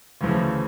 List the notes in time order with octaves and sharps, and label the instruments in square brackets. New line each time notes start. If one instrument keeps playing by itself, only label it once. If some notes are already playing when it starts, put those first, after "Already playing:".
[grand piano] D2 C#3 E3 A3 [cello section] F3